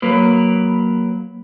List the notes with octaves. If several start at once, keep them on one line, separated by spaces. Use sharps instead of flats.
F#3 A#3 B4